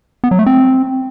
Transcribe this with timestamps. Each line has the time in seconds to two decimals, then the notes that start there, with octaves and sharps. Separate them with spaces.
0.24 B3
0.31 F#3
0.39 A3
0.46 C4